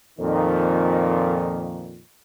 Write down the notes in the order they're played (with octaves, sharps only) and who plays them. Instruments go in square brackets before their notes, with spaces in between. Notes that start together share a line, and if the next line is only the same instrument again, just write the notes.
[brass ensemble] F2 A#2 D#3